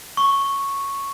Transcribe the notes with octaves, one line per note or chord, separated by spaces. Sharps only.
C#6